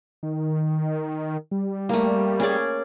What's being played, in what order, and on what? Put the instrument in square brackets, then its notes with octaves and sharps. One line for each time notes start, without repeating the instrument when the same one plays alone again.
[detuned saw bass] D#3
G3
[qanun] A3 A#3
C#4 G#4 D5